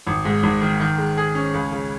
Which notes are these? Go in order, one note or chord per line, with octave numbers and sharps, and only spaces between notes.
G#1
G#2
G#1
D#3
D#3
G#3
G#4
C#4
C#2
C#3